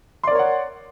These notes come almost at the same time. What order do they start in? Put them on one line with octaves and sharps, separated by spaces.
C6 D5 A#4 C#5 F#5